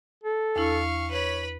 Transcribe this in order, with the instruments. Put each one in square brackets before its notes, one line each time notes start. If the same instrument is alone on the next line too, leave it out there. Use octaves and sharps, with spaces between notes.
[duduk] A4
[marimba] E2 D4 E4 [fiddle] F5 C#6
[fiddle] B4 B5 [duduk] C#5